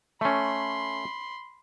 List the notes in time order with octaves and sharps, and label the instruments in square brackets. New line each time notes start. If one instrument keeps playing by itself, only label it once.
[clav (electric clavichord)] A3 C#4 [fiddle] B5 C6